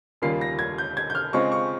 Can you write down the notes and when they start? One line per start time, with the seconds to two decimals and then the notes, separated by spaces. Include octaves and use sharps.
0.22 D#2 C#3 G3 A#3 F4 C7
0.41 A#6
0.59 G#6
0.78 G6
0.97 G#6
1.10 G6
1.15 F6
1.33 C#3 G#3 C4 F4 C#6
1.52 C#6